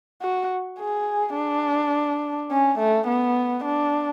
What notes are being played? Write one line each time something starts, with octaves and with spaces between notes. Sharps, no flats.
F#4
G#4
D4
C#4
A3
B3
D4